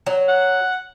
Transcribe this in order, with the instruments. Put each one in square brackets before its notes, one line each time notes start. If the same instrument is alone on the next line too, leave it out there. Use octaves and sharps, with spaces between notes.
[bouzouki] F#3
[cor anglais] F#5